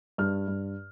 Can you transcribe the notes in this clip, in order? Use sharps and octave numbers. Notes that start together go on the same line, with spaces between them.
G2 F6
G2